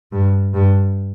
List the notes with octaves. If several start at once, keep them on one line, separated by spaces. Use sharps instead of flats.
G2
G2